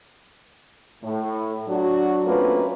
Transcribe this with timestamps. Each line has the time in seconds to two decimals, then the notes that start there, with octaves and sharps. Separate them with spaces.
1.03 A2
1.69 F#3 D4 F#4
2.26 A3 A#3 C4 C#4 F4 B4